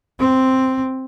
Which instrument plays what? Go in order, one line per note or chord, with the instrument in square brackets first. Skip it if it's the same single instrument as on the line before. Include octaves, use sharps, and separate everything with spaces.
[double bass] C4